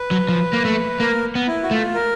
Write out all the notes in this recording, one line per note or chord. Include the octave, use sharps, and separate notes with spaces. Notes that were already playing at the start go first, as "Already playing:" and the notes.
Already playing: B4
F#3
F3
A#3
A3
A#3 A#4
B3
E4
F#4
A3 F4
A#4